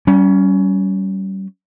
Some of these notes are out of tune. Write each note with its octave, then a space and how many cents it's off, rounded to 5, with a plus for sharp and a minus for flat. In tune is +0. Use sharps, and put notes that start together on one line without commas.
G3 -30 C#4 +15